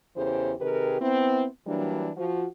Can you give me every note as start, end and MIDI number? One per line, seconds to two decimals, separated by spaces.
0.17 0.53 40
0.17 0.53 49
0.17 0.53 52
0.17 0.53 67
0.17 0.53 69
0.17 0.53 72
0.60 0.96 48
0.60 0.96 51
0.60 0.96 67
0.60 0.96 68
0.60 0.96 70
0.60 0.96 71
1.01 1.45 59
1.01 1.45 60
1.01 1.45 64
1.66 2.10 52
1.66 2.10 54
1.66 2.10 55
1.66 2.10 58
1.66 2.10 62
2.16 2.46 53
2.16 2.46 66